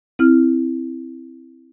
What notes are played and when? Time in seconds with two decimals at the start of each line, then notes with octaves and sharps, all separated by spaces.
0.19 C4 E4 F6